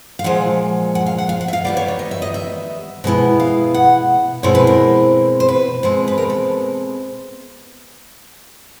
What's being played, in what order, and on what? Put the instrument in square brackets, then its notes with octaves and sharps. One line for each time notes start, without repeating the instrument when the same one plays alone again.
[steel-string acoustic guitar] F5
A#2 F3 G#3 F#5
F#5
F5
F#5
F5
F#5
E5
F5
D#3 G3 B3 D5
C#5
C#5
D#5
E5
D#5
E5
B2 G#3 B3 E4
F5
F#5
B2 G#3 C4 E4 C#5
B4
A#4
C5
B4
B2 G#3 C4
B4
A#4
A4